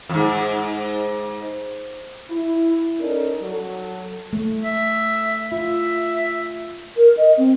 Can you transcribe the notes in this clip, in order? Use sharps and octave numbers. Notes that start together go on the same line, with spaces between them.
F2 G#2
E4
C#4 D#4 A4 A#4 D5
F#3 A4
A3
E5
F4 E5
A#4
D#5
C4